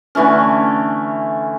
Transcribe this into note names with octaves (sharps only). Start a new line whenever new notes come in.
D3 E3 A3 C#4